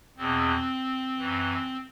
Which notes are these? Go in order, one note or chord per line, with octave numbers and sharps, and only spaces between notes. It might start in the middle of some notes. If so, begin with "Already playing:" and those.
E2 B2 C4
F#2 E3